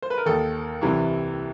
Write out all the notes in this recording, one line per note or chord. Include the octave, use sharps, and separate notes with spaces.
C5
B4
A#4
D#2 D#3 A4
C2 C3 E3